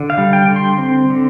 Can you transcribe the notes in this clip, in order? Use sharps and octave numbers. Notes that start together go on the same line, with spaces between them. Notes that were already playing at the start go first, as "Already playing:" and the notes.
Already playing: D3
F5
G3
G5
D3
C6
C4
D3